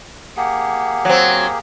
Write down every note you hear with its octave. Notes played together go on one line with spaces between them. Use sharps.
A#3 G4 G#4 F#5
F#3 C4